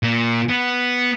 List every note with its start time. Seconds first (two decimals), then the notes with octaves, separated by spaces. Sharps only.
0.03 A#2
0.50 B3